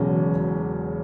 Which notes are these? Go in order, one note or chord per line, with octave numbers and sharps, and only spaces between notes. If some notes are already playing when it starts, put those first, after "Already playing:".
Already playing: E1 E2 C#3 F#3 C#4